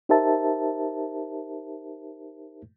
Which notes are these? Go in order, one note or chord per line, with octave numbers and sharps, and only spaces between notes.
D#4 G4 A#4 C5 E5 A5